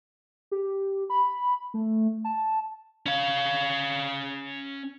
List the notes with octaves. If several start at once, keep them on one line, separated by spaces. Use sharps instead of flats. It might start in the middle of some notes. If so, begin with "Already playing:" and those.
G4
B5
A3
A5
C#4 F5